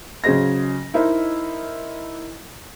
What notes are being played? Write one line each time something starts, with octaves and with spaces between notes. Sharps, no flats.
C#3 F#3 G#4 C5 D#5 A#6
D#4 E4 A#4 C5 D#5